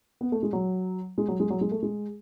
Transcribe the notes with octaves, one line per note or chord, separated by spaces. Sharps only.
B3
A3
G#3
F#3
G#3
F#3
G#3
F#3
G#3
A3
G#3